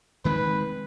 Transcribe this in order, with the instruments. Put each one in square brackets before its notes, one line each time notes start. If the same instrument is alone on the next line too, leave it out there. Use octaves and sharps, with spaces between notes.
[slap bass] D#3 G#3 C4 [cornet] B4